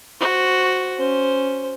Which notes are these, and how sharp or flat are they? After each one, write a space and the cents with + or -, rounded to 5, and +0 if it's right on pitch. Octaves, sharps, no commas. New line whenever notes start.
F#4 +0 C5 +0
C#4 +0 C5 +0